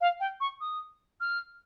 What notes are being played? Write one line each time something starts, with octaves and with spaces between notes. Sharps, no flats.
F5
G5
C#6
D#6
F6